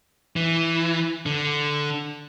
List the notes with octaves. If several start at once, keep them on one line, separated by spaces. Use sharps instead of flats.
E3
D3